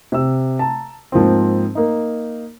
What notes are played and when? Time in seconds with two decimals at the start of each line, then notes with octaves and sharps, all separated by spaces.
0.12 C3 E6
0.59 A5 A#5
1.12 G#2 F3 A#3 C4
1.75 A#3 D#4